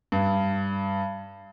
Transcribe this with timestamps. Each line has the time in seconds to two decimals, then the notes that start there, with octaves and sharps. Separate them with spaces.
0.12 G2